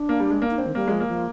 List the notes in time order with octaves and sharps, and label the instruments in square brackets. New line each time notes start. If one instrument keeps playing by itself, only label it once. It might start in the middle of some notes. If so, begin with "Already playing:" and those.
Already playing: [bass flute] D4
[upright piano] A#3
G3
G#3
A#3
[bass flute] D#4
[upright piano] C4 [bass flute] D4
[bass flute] D#3
[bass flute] G3 [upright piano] A#3
[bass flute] F3 [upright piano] G#3
[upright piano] A#3
[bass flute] F3